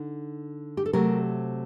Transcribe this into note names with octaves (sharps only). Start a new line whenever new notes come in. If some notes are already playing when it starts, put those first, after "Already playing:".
Already playing: D3 D#4
G4
A4
C3 F#3 A3 C4 G4 A#4